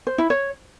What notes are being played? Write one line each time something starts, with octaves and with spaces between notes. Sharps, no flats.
C5
E4
C#5